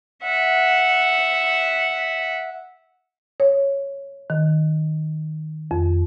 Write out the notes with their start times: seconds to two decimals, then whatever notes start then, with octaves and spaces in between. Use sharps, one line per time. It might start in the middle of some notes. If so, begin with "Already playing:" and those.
0.23 E5 F#5
3.40 C#5
4.30 D#3
5.71 F2